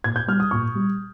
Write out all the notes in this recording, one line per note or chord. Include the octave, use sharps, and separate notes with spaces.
A#2 G#6
G6
G3 F6
D#6
A#2 C#6
G3